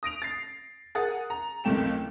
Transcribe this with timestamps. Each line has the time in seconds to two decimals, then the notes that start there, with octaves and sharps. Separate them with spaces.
0.03 D#6 A#6 D7 F7
0.22 A6 C7
0.95 G#4 A#4 F#5 D#6 A6
1.30 A#5
1.64 F#1 C#2 C3 A3 G5 E7